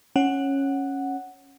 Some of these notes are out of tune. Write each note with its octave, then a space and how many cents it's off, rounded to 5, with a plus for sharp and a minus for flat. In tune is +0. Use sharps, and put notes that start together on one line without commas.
C#4 -10 F#5 +0